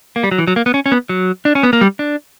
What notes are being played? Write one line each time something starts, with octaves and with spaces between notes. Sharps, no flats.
A#3
G3
F#3
E3
F#3
A#3
B3
C#4
C#4
B3
F#3
D4
C#4
B3
A#3
G3
D4